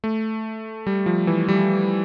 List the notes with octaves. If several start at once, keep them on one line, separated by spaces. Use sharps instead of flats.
A3
G3
F3
E3
G3